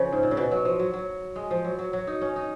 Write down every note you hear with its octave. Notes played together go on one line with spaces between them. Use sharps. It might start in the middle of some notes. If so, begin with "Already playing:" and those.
Already playing: C#3 F3
G#2
A#2
C#3
B2
F#3
F3
F#3
F#3
G#3
F3
F#3
F#3
F#3
D#4
C#4
D#4